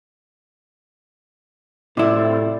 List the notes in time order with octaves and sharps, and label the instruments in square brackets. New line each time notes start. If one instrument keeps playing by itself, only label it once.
[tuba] A2 [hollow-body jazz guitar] C3 E4 [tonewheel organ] C4 F4 [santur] D5